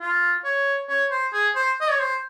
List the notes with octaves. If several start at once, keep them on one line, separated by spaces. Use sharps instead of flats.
F4
C#5
C#5
C5
G#4
C5
D#5
C#5
C5